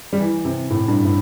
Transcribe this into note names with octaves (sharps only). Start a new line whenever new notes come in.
G3
E3
C3
A2
G2
A2